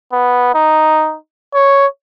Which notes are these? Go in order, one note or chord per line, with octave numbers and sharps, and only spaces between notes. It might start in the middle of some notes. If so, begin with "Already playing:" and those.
B3
D#4
C#5